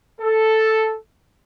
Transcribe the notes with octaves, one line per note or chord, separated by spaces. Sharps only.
A4